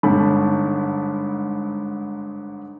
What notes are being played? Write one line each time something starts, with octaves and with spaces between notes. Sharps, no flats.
G1 G#2 A5 B5